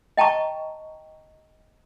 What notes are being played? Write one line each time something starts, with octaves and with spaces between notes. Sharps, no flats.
D#5 G5 A5 A#5 C#6